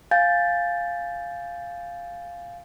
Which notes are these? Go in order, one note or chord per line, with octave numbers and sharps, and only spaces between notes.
F5 G#5 G6 A6